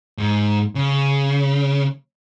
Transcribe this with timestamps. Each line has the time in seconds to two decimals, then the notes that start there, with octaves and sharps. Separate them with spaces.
0.18 G#2
0.75 C#3